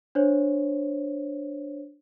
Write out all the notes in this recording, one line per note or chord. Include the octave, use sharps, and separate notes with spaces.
D4 C5 C#5